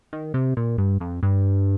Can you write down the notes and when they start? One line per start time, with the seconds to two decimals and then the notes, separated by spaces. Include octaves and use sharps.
0.13 D#3
0.34 C3
0.57 A#2
0.78 G2
1.00 F2
1.23 G2